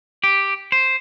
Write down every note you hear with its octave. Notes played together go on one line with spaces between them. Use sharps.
G4
C5